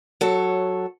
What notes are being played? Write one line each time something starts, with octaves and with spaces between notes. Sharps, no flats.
F#3 A4 C#5